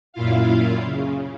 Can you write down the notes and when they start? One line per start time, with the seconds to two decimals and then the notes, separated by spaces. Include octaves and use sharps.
0.13 F#2 A#2 E4 F4 F5
0.85 C#3